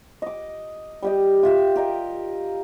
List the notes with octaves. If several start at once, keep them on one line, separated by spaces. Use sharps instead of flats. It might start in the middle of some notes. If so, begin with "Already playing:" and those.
D#5 D6
G3 G4 D#5
F4 E5 G5
G4 A#4 D#5